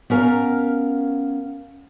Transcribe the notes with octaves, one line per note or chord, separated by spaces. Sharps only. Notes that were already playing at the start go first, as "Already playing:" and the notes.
B3 C#4 A#4 F5 A#5